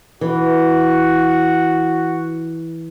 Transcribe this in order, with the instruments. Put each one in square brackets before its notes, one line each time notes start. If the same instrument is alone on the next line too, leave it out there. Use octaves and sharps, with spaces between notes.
[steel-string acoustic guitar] E3 [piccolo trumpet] F#4